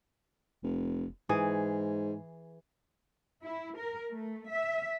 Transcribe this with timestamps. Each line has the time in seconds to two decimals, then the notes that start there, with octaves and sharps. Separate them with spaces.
0.63 F1
1.29 G#2 E3 G#4
3.44 E4
3.78 A#4
4.11 A3
4.51 E5